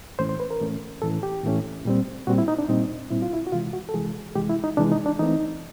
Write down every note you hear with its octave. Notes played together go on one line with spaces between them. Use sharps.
A2 E3 A3 C#4 C5
C5
B4
A#4
A2 E3 A3 C#4
A2 E3 A3 C#4 A4
G4
A2 E3 A3 C#4
A#2 G3 C4
A#2 G3 C4 F#4
E4
D#4
D4
A#2 G3 C4 D#4
A#2 G3 C4 E4
F4
E4
F#4
C3 E3 G#3 F4
F#4
A4
C3 E3 G#3 G#4
C3 E3 G#3 G4
E4
D#4
C3 E3 G#3 D4
D#4
D4
E3 A3 C4 D#4